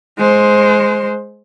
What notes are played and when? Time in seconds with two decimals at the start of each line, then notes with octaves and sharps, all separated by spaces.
0.18 G#3 C5